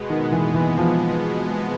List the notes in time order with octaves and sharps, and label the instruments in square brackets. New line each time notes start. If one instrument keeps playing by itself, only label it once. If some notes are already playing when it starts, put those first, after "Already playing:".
Already playing: [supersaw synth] B2 G#3 B3
[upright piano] D#3
E3
E3
F3